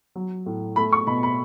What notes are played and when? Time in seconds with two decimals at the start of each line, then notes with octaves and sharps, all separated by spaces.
0.16 F#3
0.46 A2
0.76 A3 B5
0.93 C#6
1.07 B2 B5
1.23 B5